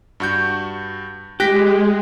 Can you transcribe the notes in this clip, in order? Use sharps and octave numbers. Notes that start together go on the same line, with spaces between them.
G2 F#4 G6
G#3 G4 F#6 A#6 B6